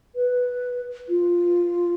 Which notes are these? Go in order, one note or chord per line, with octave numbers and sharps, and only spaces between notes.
B4
F4